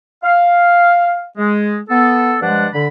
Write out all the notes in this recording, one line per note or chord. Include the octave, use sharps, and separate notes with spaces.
F5
G#3
B3 A4
G2 F3 G#3 D4 F#5
D3 B5